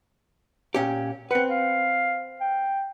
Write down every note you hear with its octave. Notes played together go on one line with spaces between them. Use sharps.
A#2 C#4 G4
C4 B4 F#5
F5
G5